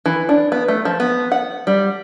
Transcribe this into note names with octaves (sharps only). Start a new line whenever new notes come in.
E3
D4
B3
A3
F3
B3
F#5
G3